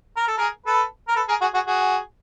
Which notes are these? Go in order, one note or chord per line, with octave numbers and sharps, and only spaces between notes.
A#4
A4
G#4 A#4
A4 B4
A#4
A4 B4
G#4 A#4
F#4 G#4
F#4 G#4
F#4 G#4